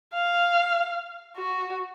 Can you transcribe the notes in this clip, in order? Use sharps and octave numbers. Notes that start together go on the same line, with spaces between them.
F5
F#4